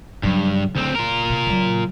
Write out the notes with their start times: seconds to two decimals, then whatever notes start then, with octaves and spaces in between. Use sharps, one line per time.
0.23 G2 C#3 F#3
0.76 D2 C4
0.95 F4 A#4
1.30 C3
1.47 C#3 F#3